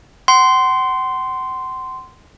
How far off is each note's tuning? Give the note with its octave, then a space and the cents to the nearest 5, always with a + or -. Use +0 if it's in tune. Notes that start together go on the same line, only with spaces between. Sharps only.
F#5 +35 C6 -10